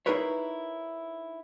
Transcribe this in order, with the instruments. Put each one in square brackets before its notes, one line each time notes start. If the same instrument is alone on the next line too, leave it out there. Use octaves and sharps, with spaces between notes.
[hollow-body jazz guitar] D#4 E4 G#4 A#4 B4 C#5